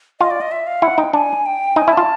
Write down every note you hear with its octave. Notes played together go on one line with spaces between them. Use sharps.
F4 D#5
D5
D#5
E5
F5
E4 F#5
D#4 G5
D4 G#5
G5
D#4 G#5
E4
F4 A5